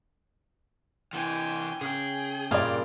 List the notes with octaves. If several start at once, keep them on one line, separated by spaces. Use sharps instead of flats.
C3 E3 G5 G#5
C#3 G#4 G5
G2 A#2 G#4 D5 F5